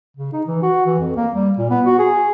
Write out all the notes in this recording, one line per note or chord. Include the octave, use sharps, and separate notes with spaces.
C#3
D#4
E3
F#4
E3
F2
A#3
G3
A#2
B3
F#4
G#4